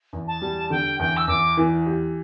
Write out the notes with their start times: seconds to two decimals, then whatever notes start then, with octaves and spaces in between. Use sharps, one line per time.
0.13 E2
0.27 A5
0.42 G3
0.70 D3 G5
0.99 E2 G5
1.17 E6
1.28 E2 D6
1.57 E3
1.86 G4